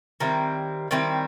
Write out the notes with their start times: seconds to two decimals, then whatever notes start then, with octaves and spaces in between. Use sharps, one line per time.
0.20 D#3 G3 C4 E4
0.91 D#3 G3 C4 E4